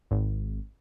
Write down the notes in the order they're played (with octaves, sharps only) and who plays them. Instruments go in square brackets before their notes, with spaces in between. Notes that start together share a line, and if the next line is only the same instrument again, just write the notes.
[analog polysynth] G#1